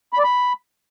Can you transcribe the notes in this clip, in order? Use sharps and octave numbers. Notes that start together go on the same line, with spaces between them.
B5
D5
B5